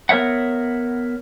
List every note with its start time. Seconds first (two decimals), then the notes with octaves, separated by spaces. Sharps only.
0.09 B3 A#4 C#5 E5 F#5